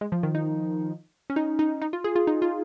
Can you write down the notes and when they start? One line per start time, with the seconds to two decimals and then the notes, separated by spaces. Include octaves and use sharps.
0.01 G#3
0.12 F3
0.23 D#3
0.35 D#4
1.30 C#4
1.36 D#4
1.59 D#4
1.82 D#4
1.93 F4
2.04 G#4
2.16 F4
2.27 D#4
2.42 F4